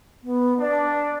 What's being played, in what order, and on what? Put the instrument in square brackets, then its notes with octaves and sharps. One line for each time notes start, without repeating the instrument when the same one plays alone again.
[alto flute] B3
[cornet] D4 [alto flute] D5